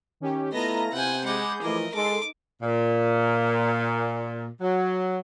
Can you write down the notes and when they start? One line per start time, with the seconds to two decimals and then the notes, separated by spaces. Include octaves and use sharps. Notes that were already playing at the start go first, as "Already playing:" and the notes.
0.20 D#3 C#4 G4
0.52 A3 B3 E4 F4 D#5 A#5 A#6
0.93 C3 F#5 G#5 G6
1.25 G#3 G#4 F#5 B5 D6
1.62 E3 F3 A3 A#4 D#5
1.94 G#3 D#4 A4 C6 D6
2.62 A#2
4.61 F#3